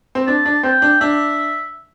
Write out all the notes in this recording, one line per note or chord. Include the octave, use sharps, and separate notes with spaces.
C4
D4 A5
D4
C4 G5
D4
D4 E5